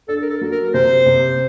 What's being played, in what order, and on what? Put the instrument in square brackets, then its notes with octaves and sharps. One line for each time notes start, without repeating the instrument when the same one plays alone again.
[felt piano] D4 [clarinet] A4
[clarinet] A#4
A4
[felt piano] F#3
[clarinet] A#4
[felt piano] C3 [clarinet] C5
[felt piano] C3